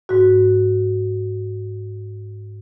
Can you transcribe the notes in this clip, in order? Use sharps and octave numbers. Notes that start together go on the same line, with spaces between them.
G#2 F#4